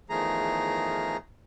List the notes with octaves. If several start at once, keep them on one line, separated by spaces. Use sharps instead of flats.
E2 D#3 F3 A3 G#4 A#5